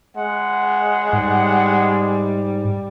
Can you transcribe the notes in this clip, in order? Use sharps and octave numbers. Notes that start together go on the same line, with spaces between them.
G#3 F#5
G#2 G3